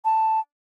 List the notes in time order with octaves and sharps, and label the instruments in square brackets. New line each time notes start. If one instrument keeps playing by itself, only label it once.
[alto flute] A5